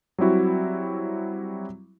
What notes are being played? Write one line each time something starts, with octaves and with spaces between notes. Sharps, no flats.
F#3 G3 C4 E4 F#4